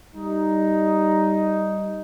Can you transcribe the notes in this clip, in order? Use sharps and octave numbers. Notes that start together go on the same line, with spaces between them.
G3 D#4